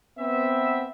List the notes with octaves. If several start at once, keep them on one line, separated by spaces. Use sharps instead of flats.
B3 C4 E5